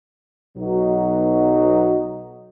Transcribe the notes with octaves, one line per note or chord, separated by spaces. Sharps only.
B1 B2 F#3 D#4 F#4